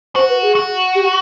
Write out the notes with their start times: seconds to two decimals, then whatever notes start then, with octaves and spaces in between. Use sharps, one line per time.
0.15 F#4 C5
0.29 B4
0.42 G#4
0.55 F#4
0.95 G4